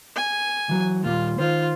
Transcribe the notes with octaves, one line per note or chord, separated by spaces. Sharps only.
G#5
E3 F#3
D#2 A#2 G3 F4
D#3 F4 C5